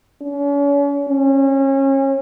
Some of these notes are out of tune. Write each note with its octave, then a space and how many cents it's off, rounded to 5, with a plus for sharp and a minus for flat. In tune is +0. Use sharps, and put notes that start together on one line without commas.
C#4 +40
C#4 -30